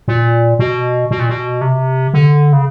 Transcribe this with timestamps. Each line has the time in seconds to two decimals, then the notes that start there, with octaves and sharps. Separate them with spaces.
0.08 A#2
0.59 B2
1.11 B2
1.19 A#2
1.29 B2
1.61 C3
2.14 D3
2.53 C#3